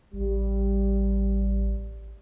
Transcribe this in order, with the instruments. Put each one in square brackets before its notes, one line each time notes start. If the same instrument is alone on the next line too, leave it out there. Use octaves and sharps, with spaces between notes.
[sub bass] A1 [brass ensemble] G3